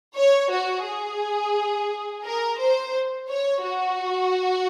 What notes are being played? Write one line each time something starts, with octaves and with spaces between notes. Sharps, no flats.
C#5
F#4
G#4
A#4
C5
C#5
F#4